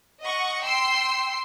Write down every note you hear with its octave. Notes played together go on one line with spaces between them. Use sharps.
D#5 F#5 C#6
G5 C6 E6 C7